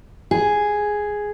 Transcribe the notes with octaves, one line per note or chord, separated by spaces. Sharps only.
G#4